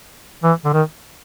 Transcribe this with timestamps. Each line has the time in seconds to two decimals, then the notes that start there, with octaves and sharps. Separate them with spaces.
0.43 E3
0.65 D3
0.73 D#3